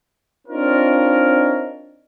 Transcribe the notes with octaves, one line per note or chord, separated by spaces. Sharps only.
C4 D4 D#4 F4 A#4 C#5